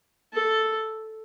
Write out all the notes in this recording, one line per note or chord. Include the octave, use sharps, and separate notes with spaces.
A4